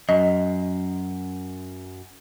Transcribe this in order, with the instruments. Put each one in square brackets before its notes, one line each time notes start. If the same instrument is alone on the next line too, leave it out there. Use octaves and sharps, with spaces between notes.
[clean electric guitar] F#2 [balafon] D#5